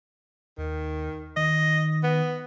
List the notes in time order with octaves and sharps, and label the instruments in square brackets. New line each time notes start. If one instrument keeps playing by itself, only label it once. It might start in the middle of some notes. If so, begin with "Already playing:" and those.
[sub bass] D#2 [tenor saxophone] D#3
[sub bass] D#3 [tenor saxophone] D#5
[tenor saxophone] B3